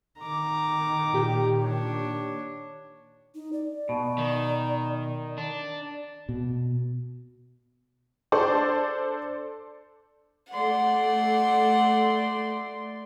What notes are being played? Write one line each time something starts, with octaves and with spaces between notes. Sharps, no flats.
D#3 A#5 D6
A#2 G4
D4 C#5
D#4
D5
B2
D#3
D4
B2
D4 A4 C5 D5
A3 D5 F#5 C6